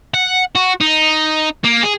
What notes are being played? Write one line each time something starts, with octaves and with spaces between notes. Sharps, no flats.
F#5
F#4
D#4
A#3
G#4